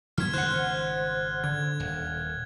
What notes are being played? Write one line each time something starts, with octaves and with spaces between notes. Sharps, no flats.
D3 G3 B3 F6 G#6
G#1 G#2 C#3 C5 F#5 F#6
D3 G#6
D#1